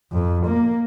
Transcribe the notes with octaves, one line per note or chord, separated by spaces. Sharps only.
F2
A#3